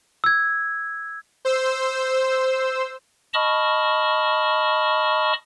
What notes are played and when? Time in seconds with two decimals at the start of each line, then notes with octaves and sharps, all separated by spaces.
0.24 E6 G#6
1.45 C5 E6
3.34 D#5 A5 B5 C#6 D#6 F6